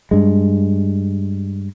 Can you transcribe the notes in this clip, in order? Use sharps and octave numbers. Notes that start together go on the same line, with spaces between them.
G2 G#3